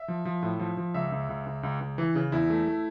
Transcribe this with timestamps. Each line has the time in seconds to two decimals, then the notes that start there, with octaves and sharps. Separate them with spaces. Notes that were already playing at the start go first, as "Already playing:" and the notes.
Already playing: E5
0.08 F3
0.25 F3
0.42 A2
0.59 F3
0.77 F3
0.94 C#2 E5
1.12 C#2
1.29 C#2
1.46 C#2
1.63 C#2
1.81 C#2
1.98 E3
2.15 C#3
2.32 E2 E4
2.50 A3
2.67 A3